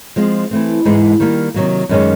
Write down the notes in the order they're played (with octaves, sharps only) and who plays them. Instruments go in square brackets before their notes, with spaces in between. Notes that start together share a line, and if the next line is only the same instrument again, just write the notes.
[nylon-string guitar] F3 G#3 C4 F4
E3 A3 C4
G#2 E3 G#3 B3 D#4
D#3 G3 A#3
C3 D#3 F#3 A#3
F#2 D#3 G#3 C#4